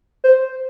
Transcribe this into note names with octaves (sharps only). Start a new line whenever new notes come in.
C5